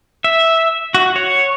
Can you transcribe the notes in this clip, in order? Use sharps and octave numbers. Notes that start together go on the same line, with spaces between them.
E5
F#4
C#5